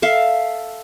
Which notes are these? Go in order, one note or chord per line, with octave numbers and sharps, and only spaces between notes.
A4 E5 F5